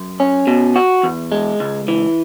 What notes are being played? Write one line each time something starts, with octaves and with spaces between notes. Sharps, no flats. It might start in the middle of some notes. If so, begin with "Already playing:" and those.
Already playing: F#2
C#4
B2
F#4
E2
G#3
C#2
E3